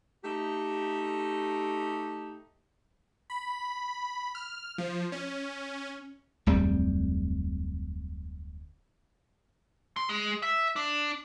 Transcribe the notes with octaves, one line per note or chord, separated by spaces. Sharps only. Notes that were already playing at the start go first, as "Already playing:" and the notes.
A3 D#4 G4
B5
F6
F3
C#4
D1 F2 G3
C6
G#3
E5
D4